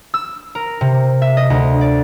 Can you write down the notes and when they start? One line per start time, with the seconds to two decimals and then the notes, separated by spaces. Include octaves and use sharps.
0.14 E6
0.55 A#4
0.81 C3
1.22 E5
1.37 D#5
1.50 D2
1.81 D5